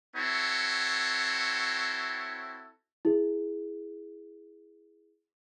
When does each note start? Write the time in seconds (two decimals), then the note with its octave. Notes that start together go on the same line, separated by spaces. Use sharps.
0.15 C4 E4 F#4 A4 C#5
3.05 E4 G#4